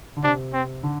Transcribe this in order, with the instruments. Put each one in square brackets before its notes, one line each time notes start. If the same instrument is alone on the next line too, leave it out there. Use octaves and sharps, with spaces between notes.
[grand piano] D3
[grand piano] C3 [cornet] D4
[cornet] C4
[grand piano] D3